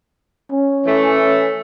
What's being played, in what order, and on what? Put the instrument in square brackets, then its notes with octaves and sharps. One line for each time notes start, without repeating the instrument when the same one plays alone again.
[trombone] C#4
[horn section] E3 A3